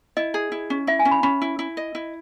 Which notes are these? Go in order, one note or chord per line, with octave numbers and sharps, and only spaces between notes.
E4 D#5
G#4
E4
C#4
E4 E5
G#5
C#4
B5
C#4 B5
E4
E4
D#5
E4